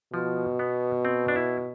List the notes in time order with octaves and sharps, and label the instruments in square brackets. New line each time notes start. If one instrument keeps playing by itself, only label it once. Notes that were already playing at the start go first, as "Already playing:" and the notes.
[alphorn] B2 [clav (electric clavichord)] F3
[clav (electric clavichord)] B3
C4
D4
E4